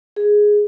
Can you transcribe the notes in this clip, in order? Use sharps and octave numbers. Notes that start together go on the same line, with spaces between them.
G#4